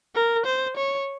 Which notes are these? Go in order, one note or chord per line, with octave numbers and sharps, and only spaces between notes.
A#4
C5
C#5